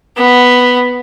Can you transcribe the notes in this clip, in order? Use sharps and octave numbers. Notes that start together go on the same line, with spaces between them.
B3